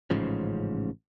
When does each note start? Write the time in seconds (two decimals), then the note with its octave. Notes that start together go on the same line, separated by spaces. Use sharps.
0.10 A1 G#2 C#3 F3